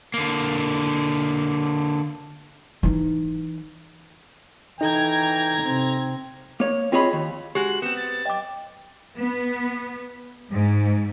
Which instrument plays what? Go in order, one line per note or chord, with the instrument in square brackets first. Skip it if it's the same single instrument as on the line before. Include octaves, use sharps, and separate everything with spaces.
[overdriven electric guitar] D3 A#3
[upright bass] E3 D#4
[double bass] E3 [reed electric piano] D#4 A4 [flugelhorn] G5 [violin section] A#5 G#6
[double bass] C3 C4
[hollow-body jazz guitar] A#3 C#5
C4 F4 G#4 C#5 D#5 B5
D#2
[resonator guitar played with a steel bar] G#3 F#4 [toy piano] G4 [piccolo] F#7
[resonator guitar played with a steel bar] B3 C4 [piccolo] E7
[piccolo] A6
[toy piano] D#5 D6 [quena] G5
[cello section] B3
G#2